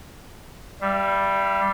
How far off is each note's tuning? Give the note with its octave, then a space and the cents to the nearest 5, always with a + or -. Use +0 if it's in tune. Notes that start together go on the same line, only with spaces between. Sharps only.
G3 +0 E5 +40